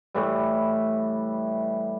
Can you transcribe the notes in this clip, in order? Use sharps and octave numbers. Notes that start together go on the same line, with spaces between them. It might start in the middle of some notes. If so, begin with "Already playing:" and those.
A2 E3 G3